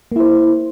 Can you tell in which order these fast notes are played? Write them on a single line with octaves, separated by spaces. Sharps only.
A#3 E4 C5